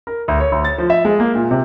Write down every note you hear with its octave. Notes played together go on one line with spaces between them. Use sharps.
A#4
D2
C#5
D2
A6
F3
E5
G#3
A#3
A#2
C3